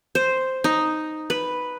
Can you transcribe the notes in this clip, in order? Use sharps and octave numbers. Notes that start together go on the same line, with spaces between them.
C5
D#4
B4